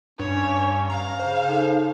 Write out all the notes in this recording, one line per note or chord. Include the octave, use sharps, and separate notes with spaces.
G2 C#4 C#5
F5 A#5
C#3 C5
D#4 A4